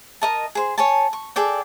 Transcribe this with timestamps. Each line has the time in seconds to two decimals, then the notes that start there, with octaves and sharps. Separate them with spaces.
0.21 A#4 D#5 A5
0.55 G#4 C5
0.78 C#5 G#5 A5
1.13 C#6
1.36 G#4 A4 D5 G5